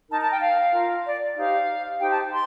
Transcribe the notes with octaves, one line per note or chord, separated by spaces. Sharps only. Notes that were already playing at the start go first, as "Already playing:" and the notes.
D#4 A#4 A5
A5
G5
F5
F4 A#4
D5
D#4 G4 C5 F5
D#4 G4 C5 G5
A5
C6